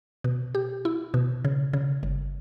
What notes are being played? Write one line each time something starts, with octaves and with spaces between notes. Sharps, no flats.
B2
G4
E4
B2
C#3
C#3
G1